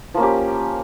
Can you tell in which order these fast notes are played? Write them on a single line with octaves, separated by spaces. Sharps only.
F3 A#3 C#4 G4